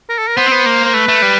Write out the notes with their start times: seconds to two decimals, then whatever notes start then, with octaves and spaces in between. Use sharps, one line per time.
0.09 A#4
0.18 A4
0.28 A#4
0.37 B3 C5
0.47 C4
0.52 B3
0.66 A#3
0.85 C5
0.94 A3 B4
1.08 A3
1.22 G3